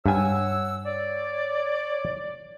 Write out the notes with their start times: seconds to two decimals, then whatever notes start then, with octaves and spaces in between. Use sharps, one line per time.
0.06 G2 C#5 F#5 G#5 E6
0.85 C#5 D5